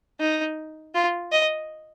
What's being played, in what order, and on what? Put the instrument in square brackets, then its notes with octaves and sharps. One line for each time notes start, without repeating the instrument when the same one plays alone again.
[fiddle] D#4
F4
D#5